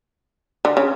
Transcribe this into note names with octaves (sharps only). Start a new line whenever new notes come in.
D3
C#3